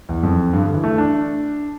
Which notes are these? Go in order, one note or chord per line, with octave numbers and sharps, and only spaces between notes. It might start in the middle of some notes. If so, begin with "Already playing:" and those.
E2
F2
G2
D3
E3
A3
D4